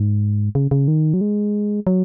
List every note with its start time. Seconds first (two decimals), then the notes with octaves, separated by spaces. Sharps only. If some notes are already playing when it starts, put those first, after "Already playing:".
Already playing: G#2
0.55 C#3
0.71 C#3
0.88 D#3
1.14 F#3
1.21 G#3
1.87 F#3